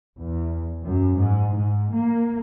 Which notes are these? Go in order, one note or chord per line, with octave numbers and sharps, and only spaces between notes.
E2
F#2
G#2
G#2
A#3